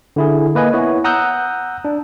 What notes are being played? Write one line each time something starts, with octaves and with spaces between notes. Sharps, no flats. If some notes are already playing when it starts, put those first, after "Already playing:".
D3 E4 G#4
A#3 B4 D#5 G#5
B3 E4 C#5
F#5 A#5 D#6 E6 F#6 G6
D4